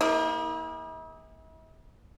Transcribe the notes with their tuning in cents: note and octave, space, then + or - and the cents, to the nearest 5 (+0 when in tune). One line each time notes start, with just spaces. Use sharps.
A#3 +0 E4 -45 G#4 -45